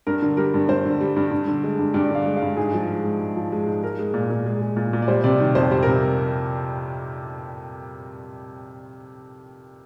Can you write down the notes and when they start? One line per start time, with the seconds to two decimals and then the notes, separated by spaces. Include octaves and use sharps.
0.07 G2 A#4
0.22 D3
0.37 G3 A#4
0.54 G2
0.68 G2 C5
0.85 D3
1.01 G3
1.16 G2
1.31 G2
1.48 D3
1.64 G#3
1.79 G2
1.94 G2 D5
2.11 D3 F5
2.26 G#3
2.36 F5
2.42 G2
2.57 G#2 G#4
2.73 F3
2.89 G#3
3.04 G#2
3.20 G#2
3.36 F3
3.52 G#3
3.67 G#2
3.83 G#3 A#4
3.99 G#3
4.14 A#2
4.30 A#2
4.46 G#3
4.61 G#3
4.77 A#2
4.93 A#2
5.02 D5
5.08 G3 C5
5.24 C3 D5
5.40 D#3
5.55 F2 C5
5.71 G3 C5
5.83 C3 A#4